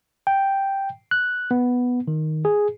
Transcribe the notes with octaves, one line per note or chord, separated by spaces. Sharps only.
G5
F#6
B3
D#3
G#4